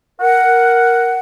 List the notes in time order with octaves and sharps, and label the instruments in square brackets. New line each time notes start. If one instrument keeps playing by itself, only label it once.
[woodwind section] A#4 F#5